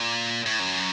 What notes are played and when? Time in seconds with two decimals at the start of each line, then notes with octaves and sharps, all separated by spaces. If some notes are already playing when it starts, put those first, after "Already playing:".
Already playing: A#2
0.46 A2
0.59 F#2